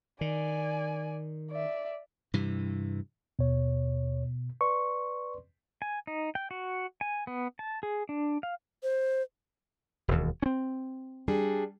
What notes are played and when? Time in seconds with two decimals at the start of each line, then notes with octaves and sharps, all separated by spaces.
0.21 D#3 D5 G#5
1.51 D5 E5
2.34 G2 C3 E3
3.39 D#2 B2 C#5
4.61 B4 D5 C6 C#6
5.82 G#5
6.07 D#4
6.35 G5
6.51 F#4
7.01 G#5
7.27 B3
7.59 A5
7.83 G#4
8.09 D4
8.43 F5
8.83 C5
10.08 E1 D#2
10.42 C4 C#4
11.28 G3 D4 G#4